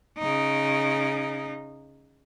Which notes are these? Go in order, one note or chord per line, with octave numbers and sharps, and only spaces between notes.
C#3 D#4